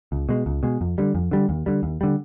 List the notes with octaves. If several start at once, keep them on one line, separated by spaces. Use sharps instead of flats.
C#2
B2 G#3
C#2
B2 G#3
F2
D3 G3
F2
D3 G3
D#2
D3 G3
D#2
D3 G3